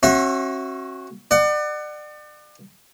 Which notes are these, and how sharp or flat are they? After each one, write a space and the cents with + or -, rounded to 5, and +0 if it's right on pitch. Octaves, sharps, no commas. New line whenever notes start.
C#4 -45 F#4 +0 E5 -5
D5 +35 F#5 +20